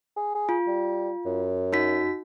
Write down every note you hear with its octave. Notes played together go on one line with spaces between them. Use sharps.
G#4
G#4
F4
G3
F#2
D#4 F#4 B6